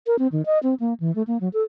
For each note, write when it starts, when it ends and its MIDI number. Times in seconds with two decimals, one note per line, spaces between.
0.07 0.16 70
0.19 0.27 60
0.32 0.45 51
0.46 0.59 75
0.63 0.74 60
0.80 0.94 58
1.00 1.14 52
1.15 1.23 57
1.27 1.38 58
1.41 1.49 54
1.53 1.63 69